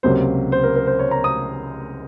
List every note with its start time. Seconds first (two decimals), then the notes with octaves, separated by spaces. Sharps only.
0.03 C#2 C3 F#3 A#3 C5
0.52 C5
0.63 A#4
0.76 A#4
0.87 C5
0.99 C#5
1.11 A#5
1.24 D#6